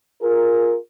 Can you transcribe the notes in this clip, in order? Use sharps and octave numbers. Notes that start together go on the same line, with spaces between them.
F4 G#4 A#4